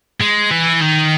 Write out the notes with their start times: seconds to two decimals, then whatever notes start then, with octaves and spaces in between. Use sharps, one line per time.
0.21 G#3
0.51 E3
0.82 D#3